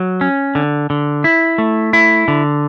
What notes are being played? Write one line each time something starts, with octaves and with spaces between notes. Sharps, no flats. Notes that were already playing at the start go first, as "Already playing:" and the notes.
Already playing: F#3
C#4
D3
D3
E4
A3
E4
D3